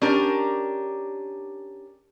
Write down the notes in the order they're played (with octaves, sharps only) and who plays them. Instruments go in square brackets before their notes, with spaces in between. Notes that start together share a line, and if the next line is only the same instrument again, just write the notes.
[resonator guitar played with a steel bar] C#4 D4 G4 A#4